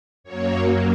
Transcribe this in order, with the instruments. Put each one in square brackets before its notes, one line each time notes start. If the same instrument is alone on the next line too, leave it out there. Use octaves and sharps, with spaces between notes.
[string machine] F#2 F#3 A#3 C#5